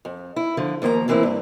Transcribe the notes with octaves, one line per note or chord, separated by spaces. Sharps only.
F2
E4
D3 F3
D#2 F3 A#3 F5 A#5
A2 E3 A#3 C4 E4
G2